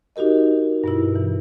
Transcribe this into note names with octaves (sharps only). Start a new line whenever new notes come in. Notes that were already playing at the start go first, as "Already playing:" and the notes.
D#4 F#4 G4 A#4 D#5
G2 B2 E4
E3